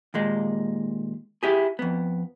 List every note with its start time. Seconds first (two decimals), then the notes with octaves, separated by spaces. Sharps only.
0.14 D#2 A#2 G#3
1.43 E4 G4 G#4
1.79 F2 B3